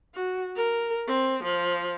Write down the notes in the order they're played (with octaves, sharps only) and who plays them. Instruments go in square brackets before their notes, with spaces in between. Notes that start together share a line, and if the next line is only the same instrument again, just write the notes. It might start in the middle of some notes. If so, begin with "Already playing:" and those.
[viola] F#4
A#4
C4
F3